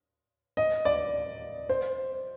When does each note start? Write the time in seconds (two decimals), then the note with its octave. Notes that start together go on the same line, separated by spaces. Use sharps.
0.57 D#5
0.85 D5
1.69 C5